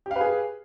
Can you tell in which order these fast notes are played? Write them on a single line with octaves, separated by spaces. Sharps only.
G4 F5 B4 G#4